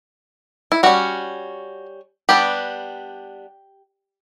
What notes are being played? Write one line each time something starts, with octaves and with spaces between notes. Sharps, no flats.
E4
G3 C#4 F#4
G3 B3 D4 G4